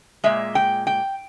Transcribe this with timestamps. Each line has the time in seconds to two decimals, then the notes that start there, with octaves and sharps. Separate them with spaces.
0.24 A#2 G#3 E5
0.55 G5
0.87 G5